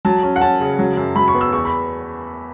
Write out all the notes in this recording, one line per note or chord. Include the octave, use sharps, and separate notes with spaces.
F#3 A5
C#4
F#5
C#4 A5
C#3
F#3
F#2
F#3 B5
C#6
B3
E6
E2 C#6
B5